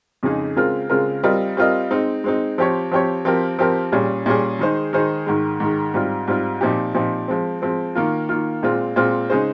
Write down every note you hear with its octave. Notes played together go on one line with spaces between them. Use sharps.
F2 C#3 G#3 D#4 G#4
C#3 G#3 C4 F4 A#4
C#3 G#3 C4 F4 A#4
G3 C4 F4 A#4 D#5
G3 C4 F4 A#4 D#5
G#3 C4 D#4
G#3 C4 D#4
F3 C4 G4 C#5
F3 C4 G4 C#5
F3 C4 G4 A#4
F3 C4 G4 A#4
A#2 G3 C#4 G#4
A#2 G3 C#4 G#4
D#3 G#3 D#4 G#4 C5
D#3 G#3 D#4 G#4 C5
G#2 D#3 G#3
G#2 D#3 G#3
G#2 G3 C4 F4
G#2 G3 C4 F4
A#2 F3 C4 D#4 G4
A#2 F3 C4 D#4 G4
F3 G#3 C4
F3 G#3 C4
D#3 A#3 F4
D#3 A#3 F4
A#2 G#3 C4 F4
A#2 G#3 C4 F4
C#3 G#3 D#4 G#4 C5